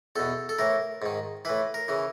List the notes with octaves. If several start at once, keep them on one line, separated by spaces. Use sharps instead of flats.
E2 B2 A4
A4
A2 E3 A#4
G#2 D#3
A2 E3 B4
A#4
C#3 E3